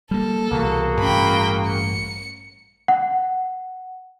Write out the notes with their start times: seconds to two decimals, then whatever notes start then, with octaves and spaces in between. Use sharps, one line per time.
0.11 G3 A#3 A4
0.51 C2 B2 E3 A#3 F#4 G#4
1.00 A1 G2 C#4 G5 B5
1.68 C#7
2.88 F#5